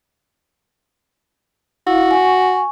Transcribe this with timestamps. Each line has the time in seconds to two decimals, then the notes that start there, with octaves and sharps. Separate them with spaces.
1.87 E4 F#4 F5
2.11 G#5 C#6